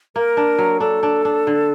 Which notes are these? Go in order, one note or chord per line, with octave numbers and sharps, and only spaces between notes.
A#3 A#4
D4
F#3
D4 A4
D4
D4
D3